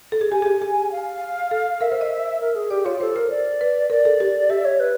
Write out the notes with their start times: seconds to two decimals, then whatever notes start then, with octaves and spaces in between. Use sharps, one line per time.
0.12 A4
0.21 G#4
0.32 G4 G#5
0.42 G#4
0.46 G4
0.62 G#4
0.92 F5
1.51 A4
1.81 A#4 E5
1.92 C5
2.01 D#5
2.41 A#4
2.55 G#4
2.71 G4 D5
2.85 F4 C#5
3.00 A4 C5
3.16 A#4 C5
3.30 D5
3.61 B4
3.90 A#4 D5
4.05 A4
4.20 G4
4.50 G4 E5
4.65 C#5
4.80 B4